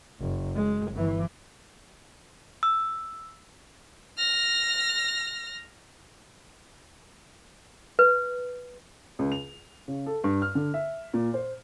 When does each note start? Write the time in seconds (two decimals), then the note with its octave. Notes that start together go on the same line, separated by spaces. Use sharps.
0.20 F#1
0.55 G#3
0.92 G1 E3
2.63 E6
4.18 F6 A#6
7.99 B4
9.19 C#2
9.32 F7
9.88 C#3
10.06 A4
10.24 G2
10.42 F6
10.55 D3
10.74 E5
11.14 A#2
11.34 C5